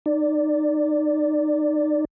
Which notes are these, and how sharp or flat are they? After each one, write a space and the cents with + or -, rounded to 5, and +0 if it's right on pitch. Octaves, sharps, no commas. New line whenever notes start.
D#4 -25 D5 +0